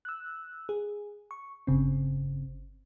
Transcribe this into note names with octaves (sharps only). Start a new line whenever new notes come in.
E6 F#6
G#4
C#6
G1 C#3 C4